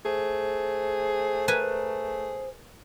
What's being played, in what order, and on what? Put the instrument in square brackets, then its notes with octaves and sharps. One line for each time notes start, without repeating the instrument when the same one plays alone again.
[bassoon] A3 [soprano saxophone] G#4 [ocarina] C5
[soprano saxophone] G#4 [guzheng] A#4 B4 G#5